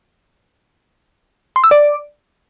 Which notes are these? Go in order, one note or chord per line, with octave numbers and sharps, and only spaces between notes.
C6
E6
D5